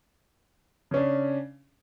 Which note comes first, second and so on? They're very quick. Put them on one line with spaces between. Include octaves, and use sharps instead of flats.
C#3 C#4 D4